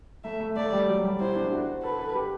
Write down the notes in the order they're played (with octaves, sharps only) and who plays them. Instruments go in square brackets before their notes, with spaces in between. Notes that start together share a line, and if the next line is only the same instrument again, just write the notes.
[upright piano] A3 [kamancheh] E5
[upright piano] A3
[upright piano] A3 [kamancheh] D5
[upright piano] G3
F#3
G3
[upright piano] E4 [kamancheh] C5
[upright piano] D4
F#4
[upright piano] A4 [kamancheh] B4
[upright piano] A4
G4